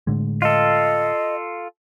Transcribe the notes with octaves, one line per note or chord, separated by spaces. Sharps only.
A2 D3 G#3
F4 A4 D#5